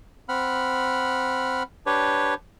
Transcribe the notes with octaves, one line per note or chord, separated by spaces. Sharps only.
C4 F#5 B5 F6
D4 G4 B4 C#5